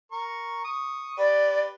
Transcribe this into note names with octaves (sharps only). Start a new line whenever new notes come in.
A#4 C#6
C#6 D#6
G4 B4 D5